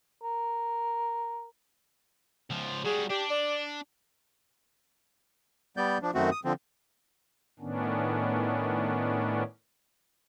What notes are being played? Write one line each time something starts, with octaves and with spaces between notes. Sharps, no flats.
A#4
C#2 F3
G3 F#4 G#4
D4 G4
D5
G3 B3 D5 G6
F3 D4
F#2 D#3 A3 C4 F#4
D#6
D3 F3 C4
A2 D#3 B3 C#4 D4